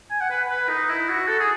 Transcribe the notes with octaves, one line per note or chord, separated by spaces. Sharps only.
G#5
F#5
B4
B4
D#4
E4
F#4
A4
G#4